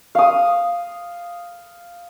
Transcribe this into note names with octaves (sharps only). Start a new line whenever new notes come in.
F5 D#6